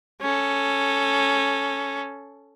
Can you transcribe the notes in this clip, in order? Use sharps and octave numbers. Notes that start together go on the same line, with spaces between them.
C#4 A4